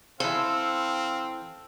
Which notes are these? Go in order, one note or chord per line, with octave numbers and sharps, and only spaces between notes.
E3 C4 A4 C5 F5